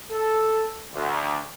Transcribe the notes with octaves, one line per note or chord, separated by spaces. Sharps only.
A4
D2